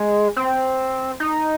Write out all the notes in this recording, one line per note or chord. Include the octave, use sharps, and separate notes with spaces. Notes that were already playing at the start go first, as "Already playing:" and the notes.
Already playing: G#3
C4
D#4